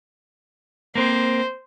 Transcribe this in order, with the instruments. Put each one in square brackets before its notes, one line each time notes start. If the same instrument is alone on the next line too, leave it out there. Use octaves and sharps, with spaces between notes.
[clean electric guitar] A#3 C4 [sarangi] C5